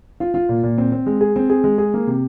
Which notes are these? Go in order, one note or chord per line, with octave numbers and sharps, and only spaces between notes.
F4
F4
A#2
A#2
C4
C4
G#3
G#4
C4
G#4
G#3
G#4
A#3
C3